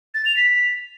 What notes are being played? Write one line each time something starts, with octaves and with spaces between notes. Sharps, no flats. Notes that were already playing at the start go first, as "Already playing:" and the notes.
A6
F7
B6